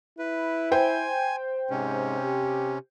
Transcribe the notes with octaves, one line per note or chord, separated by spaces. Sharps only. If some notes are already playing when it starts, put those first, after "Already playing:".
E4 B4
C5 G5 G#5
G#2 C3 C#4
G4